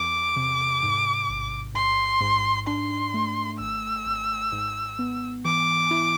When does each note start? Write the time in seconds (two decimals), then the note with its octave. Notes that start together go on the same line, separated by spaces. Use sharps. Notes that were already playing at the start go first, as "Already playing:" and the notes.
Already playing: E2 D6
0.36 C3
0.83 G#2
1.29 A1
1.75 G#2 C6
2.21 G#2
2.67 D4 C6
3.14 A3
3.60 G#1 E6
4.06 G#1
4.52 G#2
4.99 B3
5.45 E3 D6
5.91 E4